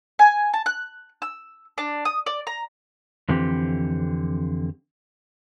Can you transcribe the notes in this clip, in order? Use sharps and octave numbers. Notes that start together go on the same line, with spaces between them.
G#5
A5
F#6
E6
D4
D#6
D5
A#5
F2 D3 E3 C4 G4